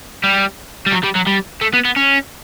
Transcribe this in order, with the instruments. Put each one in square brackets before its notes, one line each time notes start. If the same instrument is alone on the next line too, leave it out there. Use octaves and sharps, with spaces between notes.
[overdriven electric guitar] G3
G3
F#3
G3
F#3
G3
A3
B3
B3
C#4